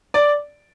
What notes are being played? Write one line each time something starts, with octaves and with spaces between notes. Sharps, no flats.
D5